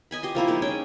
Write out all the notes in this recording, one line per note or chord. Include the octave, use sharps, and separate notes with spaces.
D#5 G#5 B5
G4 D#5 C6
F3 A#3 E4 C5
G#3 D#4 D5
C#4 G#4 G5 G#5